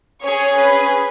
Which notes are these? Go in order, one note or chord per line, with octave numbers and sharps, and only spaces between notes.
C#4 G#4 C#5
B4